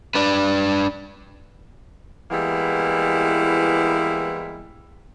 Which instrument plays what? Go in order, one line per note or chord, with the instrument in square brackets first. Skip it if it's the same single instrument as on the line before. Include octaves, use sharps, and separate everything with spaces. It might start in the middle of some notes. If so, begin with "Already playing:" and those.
[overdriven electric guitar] D4 B4
[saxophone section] E3 G3 G#3 A#3 B3 E4